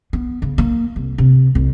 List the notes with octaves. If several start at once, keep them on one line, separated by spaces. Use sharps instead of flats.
B3
C#3
A#3
C2
C3
C2